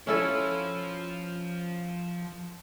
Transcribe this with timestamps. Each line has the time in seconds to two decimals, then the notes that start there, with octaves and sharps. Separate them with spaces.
0.07 F3 C#4 E4 A4